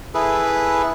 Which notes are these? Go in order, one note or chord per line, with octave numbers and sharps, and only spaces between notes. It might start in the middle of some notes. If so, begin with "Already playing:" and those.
E4 G#4 A4 B4